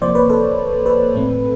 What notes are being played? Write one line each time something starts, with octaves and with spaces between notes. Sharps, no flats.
C3 F3 A#3 C5 D5
B4 C#5
A4 B4
A4 B4
A2 E3 A3 C4